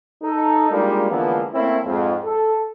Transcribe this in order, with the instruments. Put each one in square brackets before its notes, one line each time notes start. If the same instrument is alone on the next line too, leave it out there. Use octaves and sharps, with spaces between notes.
[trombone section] D#4 A4
G3 G#3 A#3 D4 D#4 F4
D3 E3 F3 G#3 A#3 B3
A3 A#3 C4 C#4 E4
F2 G#2
A4